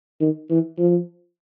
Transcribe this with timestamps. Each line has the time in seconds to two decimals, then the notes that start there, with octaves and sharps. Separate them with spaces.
0.21 D#3
0.50 E3
0.78 F3